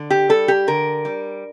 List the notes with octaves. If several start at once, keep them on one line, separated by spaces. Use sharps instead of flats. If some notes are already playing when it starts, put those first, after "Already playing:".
Already playing: D3
G4
G3 A4
G4
D3 A#4
G3